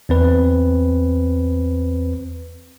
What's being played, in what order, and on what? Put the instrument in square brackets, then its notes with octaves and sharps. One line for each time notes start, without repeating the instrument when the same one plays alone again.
[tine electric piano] E2 C4 B4